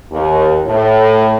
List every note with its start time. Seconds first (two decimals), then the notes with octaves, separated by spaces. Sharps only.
0.11 D#2
0.64 A2